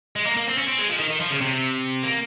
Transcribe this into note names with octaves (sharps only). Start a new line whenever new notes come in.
G#3
A#3
A#3
C4
C#4
C4
G#3
F3
D#3
D#3
F3
C#3
C3
A#3